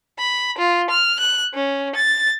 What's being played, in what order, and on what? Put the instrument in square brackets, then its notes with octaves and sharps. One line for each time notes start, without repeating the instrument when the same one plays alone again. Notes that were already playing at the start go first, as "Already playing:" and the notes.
[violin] B5
F4
F6
F#6
C#4
A6